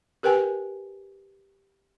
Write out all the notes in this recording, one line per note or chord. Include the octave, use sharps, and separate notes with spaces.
G4 A#4 B4 G5 G#5